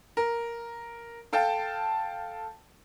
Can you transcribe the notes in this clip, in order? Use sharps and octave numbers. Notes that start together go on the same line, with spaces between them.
A#4
A4 F5 G5 A5